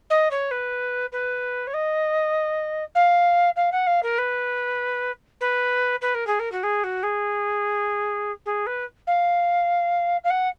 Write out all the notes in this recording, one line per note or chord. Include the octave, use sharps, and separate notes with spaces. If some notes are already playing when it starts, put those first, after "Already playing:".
D#5
C#5
B4
B4
C#5
D#5
F5
F5
F#5
F5
A#4
B4
B4
B4
A#4
G#4
A#4
F#4
G#4
F#4
G#4
G#4
B4
F5
F5
F#5